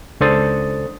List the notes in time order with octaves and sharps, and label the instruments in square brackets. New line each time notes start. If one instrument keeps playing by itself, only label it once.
[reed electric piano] C#2 D4 A4 C5 D#6 A6